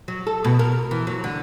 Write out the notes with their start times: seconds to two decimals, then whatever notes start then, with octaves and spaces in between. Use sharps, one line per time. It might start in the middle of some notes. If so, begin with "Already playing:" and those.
0.08 F#3
0.27 A4
0.44 B2
0.59 A#4
0.91 E3
1.07 F#3
1.24 D3